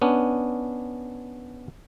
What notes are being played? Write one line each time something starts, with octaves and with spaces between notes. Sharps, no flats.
B3 C#4 D4